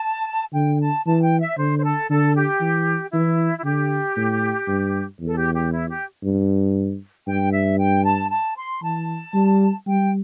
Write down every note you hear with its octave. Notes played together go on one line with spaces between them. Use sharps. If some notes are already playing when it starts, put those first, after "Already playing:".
Already playing: A5
D3 G5
A5
E3 A5
G5
E5
D3 C5
C5
A4
D3 A4
G4
E3
E3 E4
E4
D3 G4
A2
G2
E2
A4
G4
G4
E4
G4
G2
G2 G5
E5
G5
A5
A5
C6
E3 A5
G3
G3 G5